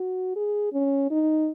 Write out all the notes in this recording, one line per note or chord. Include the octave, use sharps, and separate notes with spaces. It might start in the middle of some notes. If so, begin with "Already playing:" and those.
Already playing: F#4
G#4
C#4
D#4